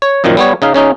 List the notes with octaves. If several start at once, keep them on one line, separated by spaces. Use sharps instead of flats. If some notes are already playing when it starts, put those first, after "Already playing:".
C#5
F#2 A#2 D#3 F3
G3 B3 C#5
C#3 D#4 F5
C#3 C#4 D#4